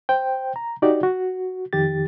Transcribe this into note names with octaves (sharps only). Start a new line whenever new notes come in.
C5 G5
A#5
D#4 F#4 G4 D5
F#4
F2 D#3 G4 A6